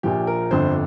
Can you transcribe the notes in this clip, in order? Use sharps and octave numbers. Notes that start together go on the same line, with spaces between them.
A#1 A#2 F3 G4
A#4
G1 F2 D3 C5